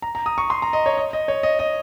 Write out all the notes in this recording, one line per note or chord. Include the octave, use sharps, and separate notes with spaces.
A#5
A#5
D#6
C#6
C6
A#5
D#5
C#5
D#5
D#5
C#5
D#5
D#5